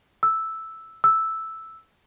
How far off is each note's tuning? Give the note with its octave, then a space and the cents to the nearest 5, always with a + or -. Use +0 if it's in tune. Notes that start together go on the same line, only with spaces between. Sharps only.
E6 -5
E6 -5